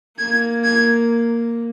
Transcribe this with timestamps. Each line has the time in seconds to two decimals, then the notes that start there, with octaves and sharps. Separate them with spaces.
0.19 A#3 G#6
0.64 G#6